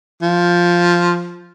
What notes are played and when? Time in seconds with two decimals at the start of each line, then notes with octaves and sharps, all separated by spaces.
0.22 F3